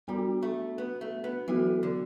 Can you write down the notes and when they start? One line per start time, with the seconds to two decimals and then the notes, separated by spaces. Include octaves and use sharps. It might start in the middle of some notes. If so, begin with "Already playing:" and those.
0.08 G3 B3 D4 F#4
0.43 A3
0.78 B3
1.01 A3
1.24 B3
1.48 E3 F#3 B3 F#4 A4
1.83 D3